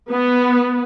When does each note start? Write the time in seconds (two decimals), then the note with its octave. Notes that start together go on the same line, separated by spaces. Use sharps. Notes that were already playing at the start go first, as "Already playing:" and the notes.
0.11 B3